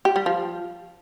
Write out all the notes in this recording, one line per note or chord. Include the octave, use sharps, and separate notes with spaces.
G4
G3
F3